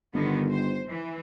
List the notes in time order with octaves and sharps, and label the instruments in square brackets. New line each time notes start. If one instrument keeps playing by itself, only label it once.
[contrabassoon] G1 [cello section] D3 D#3 B3
[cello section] C5
E3